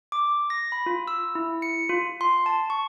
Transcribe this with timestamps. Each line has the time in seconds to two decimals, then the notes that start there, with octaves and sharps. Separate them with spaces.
0.12 D6
0.50 A#6
0.72 B5
0.86 F4
1.08 E6
1.35 E4
1.62 C#7
1.89 F4
2.21 C6
2.46 A5
2.70 C#6